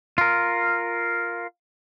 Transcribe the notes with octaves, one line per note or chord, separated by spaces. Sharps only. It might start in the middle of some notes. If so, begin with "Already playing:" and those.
F4 A#4